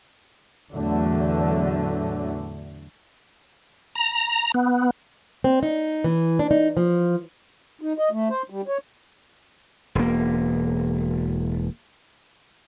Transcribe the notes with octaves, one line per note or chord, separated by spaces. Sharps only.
E2 A2 D3 F#3 A3
A#5
B3
C4
D#4
E3
D4
D#4
F3
D#4
D#5
A3
C5
G3
C#5
E1 A#3